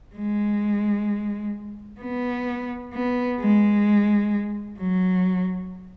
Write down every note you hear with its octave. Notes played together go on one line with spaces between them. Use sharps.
G#3
B3
B3
G#3
F#3